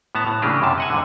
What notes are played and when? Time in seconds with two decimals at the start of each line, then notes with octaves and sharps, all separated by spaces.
0.15 A2 B3 A5 A#5
0.26 A2
0.42 C#3 E3 A#3 D4 G4 G#4
0.62 F#2 C3 A5
0.78 D#5 F#5 G#5
0.90 F2 G#2 D3